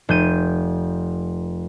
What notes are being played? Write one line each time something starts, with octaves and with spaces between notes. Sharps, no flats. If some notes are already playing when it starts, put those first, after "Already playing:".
F1 G6 D#7